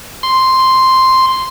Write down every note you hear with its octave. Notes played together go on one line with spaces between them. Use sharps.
C6